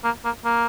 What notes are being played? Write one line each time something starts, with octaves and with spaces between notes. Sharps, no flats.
A#3
A#3
A#3